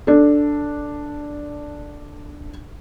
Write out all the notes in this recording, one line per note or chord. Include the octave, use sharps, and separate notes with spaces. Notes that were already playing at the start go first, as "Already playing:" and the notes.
D4 A4